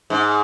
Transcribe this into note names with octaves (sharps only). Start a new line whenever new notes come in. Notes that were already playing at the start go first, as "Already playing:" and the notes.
G#2